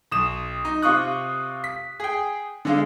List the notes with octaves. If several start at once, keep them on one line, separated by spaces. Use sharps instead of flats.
B1 D#6 E7
D#4
C3 F4 C#6 D#6 F#6
B6
G#4 G5
D3 G#3 F5